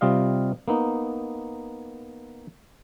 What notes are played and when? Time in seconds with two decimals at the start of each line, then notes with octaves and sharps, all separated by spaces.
0.01 C3 G3 F4 D#5 F5
0.68 A#3 B3 D#4